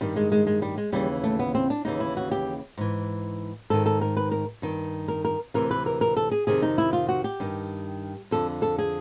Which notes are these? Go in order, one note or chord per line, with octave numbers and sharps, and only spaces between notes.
G2 D#3 G3
G#3
G#3
G#3
G3
G#3
D#2 C#3 E3 G3
A3
B3
C4
D4
D#2 C#3 E3 D#4
E4
F#4
G4
G#2 E3
G#2 D#3 A4
A4
A#4
B4
A#4
G2 D#3
A#4
A#4
D2 C3 E3 A#4
B4
A#4
A#4
A4
G#4
F2 C3 D#3 G#4
D#4
E4
F4
F#4
G4
G2 D#3
F2 D3 A4
A4
G#4